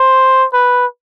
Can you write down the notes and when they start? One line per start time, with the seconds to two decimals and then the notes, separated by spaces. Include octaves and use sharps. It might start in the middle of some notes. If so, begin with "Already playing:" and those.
Already playing: C5
0.53 B4